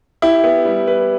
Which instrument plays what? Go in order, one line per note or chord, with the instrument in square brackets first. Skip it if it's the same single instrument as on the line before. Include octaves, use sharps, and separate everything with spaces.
[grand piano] E4 [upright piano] G4
[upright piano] B3
G3
B4